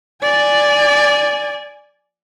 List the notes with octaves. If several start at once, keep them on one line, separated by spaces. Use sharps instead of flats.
D5 G#5